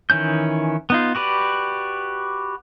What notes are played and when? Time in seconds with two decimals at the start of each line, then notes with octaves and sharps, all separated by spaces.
0.10 D#3 E3 C#4 G6
0.90 B3 D#4 F4
1.15 F#4 G4 B4 D5